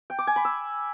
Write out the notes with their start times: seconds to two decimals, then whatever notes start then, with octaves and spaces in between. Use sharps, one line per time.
0.10 G5
0.19 D6
0.27 G#5
0.36 B5
0.45 E6